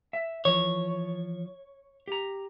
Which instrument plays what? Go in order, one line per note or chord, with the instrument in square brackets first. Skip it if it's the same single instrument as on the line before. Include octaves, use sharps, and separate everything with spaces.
[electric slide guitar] E5
[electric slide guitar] E3 F3 [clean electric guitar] C#5
[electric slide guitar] G4 A#5